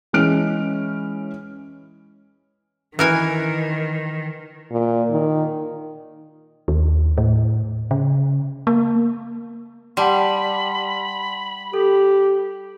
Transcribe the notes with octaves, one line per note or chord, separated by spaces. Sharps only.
E3 G#3 C#4 F6 D7
D#3 E3 A#4 G#5
A#2
D#3
D#2
A2
C#3
A#3
G3 F#5 A5 B5 C6
G4 A4